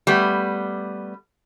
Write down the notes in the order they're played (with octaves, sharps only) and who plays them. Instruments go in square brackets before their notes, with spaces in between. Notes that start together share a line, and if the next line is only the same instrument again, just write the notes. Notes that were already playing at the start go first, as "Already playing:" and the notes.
[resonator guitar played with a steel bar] G3 A3 B3